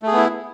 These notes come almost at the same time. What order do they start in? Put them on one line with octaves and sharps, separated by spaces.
A3 G#4 B3 E4